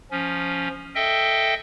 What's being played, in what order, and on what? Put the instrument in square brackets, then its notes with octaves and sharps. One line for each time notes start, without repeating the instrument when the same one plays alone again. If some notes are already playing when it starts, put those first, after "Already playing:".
[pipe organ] F3 C#4
A4 D#5 E5 G5